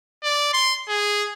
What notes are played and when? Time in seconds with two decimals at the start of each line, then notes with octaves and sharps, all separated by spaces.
0.24 D5
0.53 C6
0.88 G#4